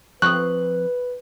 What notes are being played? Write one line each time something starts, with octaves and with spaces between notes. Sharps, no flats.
F3 C4 B4 C#6 D#6 F#6